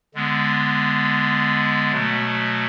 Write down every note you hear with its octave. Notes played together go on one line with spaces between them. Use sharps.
D3 G#3 B3
B2 F#3 A3